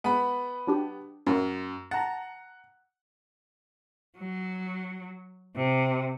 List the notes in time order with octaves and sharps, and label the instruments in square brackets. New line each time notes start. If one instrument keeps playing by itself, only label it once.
[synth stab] G#3 [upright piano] B3 B5
[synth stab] F#3 D4 G4
[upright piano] F#2 [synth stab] F#3 A#3 C#4
[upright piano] F#5 [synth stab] A5 A#5
[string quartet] F#3
C3